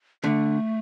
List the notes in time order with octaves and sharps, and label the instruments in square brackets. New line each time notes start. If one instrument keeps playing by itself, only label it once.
[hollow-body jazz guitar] D3 [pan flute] A3